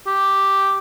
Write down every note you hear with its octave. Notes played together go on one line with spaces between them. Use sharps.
G4